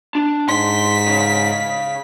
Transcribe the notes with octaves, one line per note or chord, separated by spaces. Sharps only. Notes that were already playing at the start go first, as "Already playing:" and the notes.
D4
G#2 C6 B6
C#3